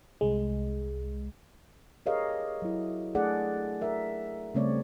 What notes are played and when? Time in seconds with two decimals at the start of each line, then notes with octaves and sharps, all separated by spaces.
0.21 C2 G#3
2.06 G4 G#4 A#4 C#5 D#5 F5
2.62 F#3 E4
3.15 A3 D4 G#4 A4 D5 F#5
3.81 A#4 E5
4.55 C#3 G3 A3 C4 C#5 D5